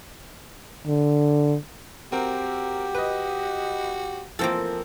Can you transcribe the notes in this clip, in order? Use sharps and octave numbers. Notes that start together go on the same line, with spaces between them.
D3
C4 F#4 G4 A#4
B4 D#5
E3 F3 A#3 C4 A4